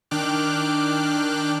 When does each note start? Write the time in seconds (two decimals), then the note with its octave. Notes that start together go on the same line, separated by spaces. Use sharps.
0.11 D#3 D4 G5 D6 F6 F#6